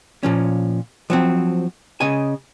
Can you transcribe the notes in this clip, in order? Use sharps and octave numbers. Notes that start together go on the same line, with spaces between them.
A#2 F3 C#4
F3 F#3 C4
C#3 D#5 G#5